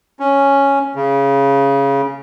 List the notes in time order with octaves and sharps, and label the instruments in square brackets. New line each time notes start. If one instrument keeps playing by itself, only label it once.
[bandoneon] C#4
C#3